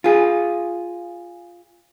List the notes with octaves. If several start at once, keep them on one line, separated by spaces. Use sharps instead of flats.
F4 G#4